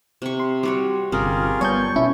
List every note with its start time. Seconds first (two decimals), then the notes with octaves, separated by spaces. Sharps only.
0.22 C3 C#6
0.40 C6
0.63 G3 F#4 C#5
1.12 G1 C3 G3 C#4 F4 G#4 A#4
1.61 G3 B3 C#5 G#5 A5 C#6 G6
1.96 B2 C#4 E4